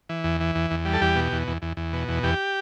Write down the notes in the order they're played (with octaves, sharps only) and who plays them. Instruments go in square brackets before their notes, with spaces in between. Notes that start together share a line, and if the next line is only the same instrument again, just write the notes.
[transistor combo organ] E3
E2
E3
E2
E2
G3
A4
E2 G4
B2
E2
E2
E2
E2
B2
E2
E2 G4